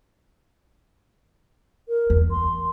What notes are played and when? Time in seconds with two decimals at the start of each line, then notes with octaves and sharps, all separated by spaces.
1.89 A#4
2.10 E2
2.31 C6